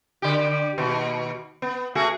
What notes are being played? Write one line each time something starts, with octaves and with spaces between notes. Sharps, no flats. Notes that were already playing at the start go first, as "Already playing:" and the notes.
D3 G4
D#2 B2
B3
A3 F#4 G#4